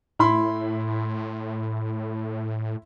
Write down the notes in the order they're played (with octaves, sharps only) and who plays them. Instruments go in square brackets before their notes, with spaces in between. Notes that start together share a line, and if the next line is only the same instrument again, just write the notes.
[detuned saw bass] A2 [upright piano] E4 B5 C6